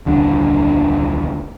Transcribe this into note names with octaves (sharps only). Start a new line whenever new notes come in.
D#1 C2 D3 D4